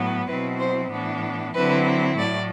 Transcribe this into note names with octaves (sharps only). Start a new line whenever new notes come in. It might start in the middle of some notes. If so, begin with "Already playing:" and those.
Already playing: A2 F#3 B3
B2 F#3 C4 E4 B4
C5
A2 E3 B3 D4
D3 F#3 C4 E4 B4
A2 F#3 A3 D5